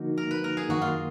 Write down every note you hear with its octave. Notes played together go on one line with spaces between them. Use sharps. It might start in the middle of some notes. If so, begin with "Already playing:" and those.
Already playing: D3 F3 A#3 D#4 F#4
A#4
B4
A#4
G#4
F#2 D#3 A#3 F#4
F4